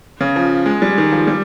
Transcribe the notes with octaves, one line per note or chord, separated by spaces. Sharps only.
C#3
F3
G#3
G3
D#3
F3
G3